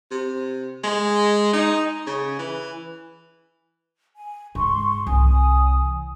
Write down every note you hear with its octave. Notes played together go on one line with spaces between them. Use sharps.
C3
G#3
D#4
C#3
E3
G#5
G#2 C6 C#6
C2 E3 G#5 D#6